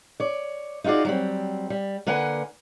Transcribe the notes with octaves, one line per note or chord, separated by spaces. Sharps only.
C#5 D5
D#4 F4 F#4 G#4 D5
F#3 G3 C4
G3
D3 A#3 B4 F#5 G#5